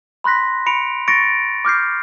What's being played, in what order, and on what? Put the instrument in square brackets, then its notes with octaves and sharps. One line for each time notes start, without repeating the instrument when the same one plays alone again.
[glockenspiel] B5 C6 F#6 A#6 B6
B5 C#7 D7 F7
C#6 A6 A#6 C#7 D7
D6 F6 G6 C7